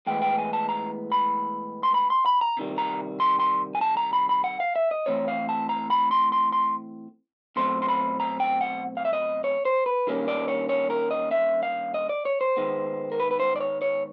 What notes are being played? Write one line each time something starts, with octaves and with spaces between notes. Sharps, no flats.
A2 E3 G#3 B3 G5
G5
G#5
A5
A#5
B5
C6
B5
C6
B5
A#5
C3 D#3 G3
A#5
C6
C6
G#5
A5
A#5
B5
B5
F#5
F5
E5
D#5
A2 E3 G#3 C4 C#5
F5
A5
A#5
B5
C6
C6
C6
B2 F#3 A3 C4 C6
C6
B5
A#5
G5
F#5
F5
E5
D#5
C#5
C5
B4
G2 D#3 G3 A#3 C#4
D5
C#5
C#5
A#4
D#5
E5
F5
D#5
D5
C#5
C5
G#2 D#3 G#3 B3
A#4
B4
B4
C5
D5
C#5
C#5